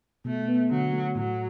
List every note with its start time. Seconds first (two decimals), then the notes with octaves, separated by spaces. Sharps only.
0.25 B2 A3
0.48 B3
0.70 D3 F#3
0.93 A3
1.15 A2 F#3